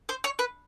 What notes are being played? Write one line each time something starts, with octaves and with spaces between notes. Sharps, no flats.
C5
C#5
B4